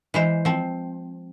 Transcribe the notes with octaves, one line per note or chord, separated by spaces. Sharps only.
E3 G#3 C5
F3 C4